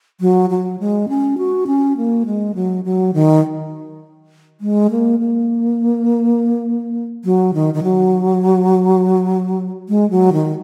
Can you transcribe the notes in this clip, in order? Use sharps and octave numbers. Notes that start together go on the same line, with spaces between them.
F#3
F#3
G#3
C#4
F#4
C#4
A#3
G#3
F#3
F#3
D#3
G#3
A#3
A#3
F#3
D#3
D#3
F#3
G#3
F#3
D#3